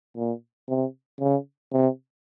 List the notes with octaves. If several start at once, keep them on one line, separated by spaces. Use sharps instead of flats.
A#2
C3
C#3
C3